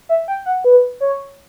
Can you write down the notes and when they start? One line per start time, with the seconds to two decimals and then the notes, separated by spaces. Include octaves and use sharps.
0.09 E5
0.28 G5
0.46 F#5
0.64 B4
1.01 C#5